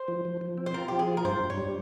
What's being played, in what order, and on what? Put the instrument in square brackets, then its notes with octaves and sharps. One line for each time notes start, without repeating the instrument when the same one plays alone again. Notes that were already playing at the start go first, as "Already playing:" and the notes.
Already playing: [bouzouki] C5
[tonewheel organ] F3
F3
F3
C4
[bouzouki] C5
[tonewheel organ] F4 [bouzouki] A#4
[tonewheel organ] F3 [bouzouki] G4
[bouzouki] G#4
[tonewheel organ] F4
[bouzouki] A#4
[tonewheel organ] G2 [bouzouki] C5
[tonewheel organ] G2
[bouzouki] C#5
[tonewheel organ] G3